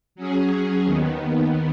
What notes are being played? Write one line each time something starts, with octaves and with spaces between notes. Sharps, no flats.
F#3 C#4 G#4
D#2 D#3 B3